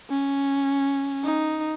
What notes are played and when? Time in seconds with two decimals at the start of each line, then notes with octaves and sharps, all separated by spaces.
0.10 C#4
1.24 D#4